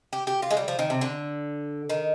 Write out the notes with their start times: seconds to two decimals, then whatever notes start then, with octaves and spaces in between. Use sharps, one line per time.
0.13 G4
0.27 G4
0.42 F4
0.51 G#3
0.57 G3
0.68 F3
0.79 D#3
0.90 C3
1.01 D3
1.90 D#3